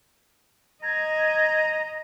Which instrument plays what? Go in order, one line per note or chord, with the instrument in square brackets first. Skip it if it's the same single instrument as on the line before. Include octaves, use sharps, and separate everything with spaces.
[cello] D#5 [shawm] A#5 [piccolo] G#6